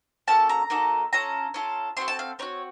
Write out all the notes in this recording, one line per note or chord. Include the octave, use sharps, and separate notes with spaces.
A#3 C#4 F#4 A4 A5
A#5
A#3 D#4 F#4 A4
C#4 F4 A4 A#5
C#4 F4 A4
C4 F#4 A4 C6
A5
F5
C4 D#4 F#4 C#5